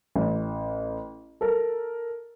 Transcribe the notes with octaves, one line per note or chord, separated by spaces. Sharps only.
A1
A4 A#4